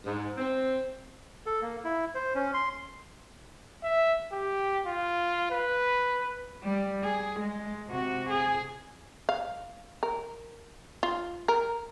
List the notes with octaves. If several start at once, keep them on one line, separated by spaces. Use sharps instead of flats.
G#2
C4
A4
A#3
E4
C5
C#4
C6
E5
G4
F4
B4
G3
G#4
G#3
C3 F#4
G#4
F5
A#4
F4
A#4